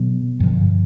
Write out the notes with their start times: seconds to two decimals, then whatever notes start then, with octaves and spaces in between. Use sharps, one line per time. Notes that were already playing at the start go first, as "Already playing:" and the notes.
Already playing: B2 F#3 B3
0.40 G2 D3 F3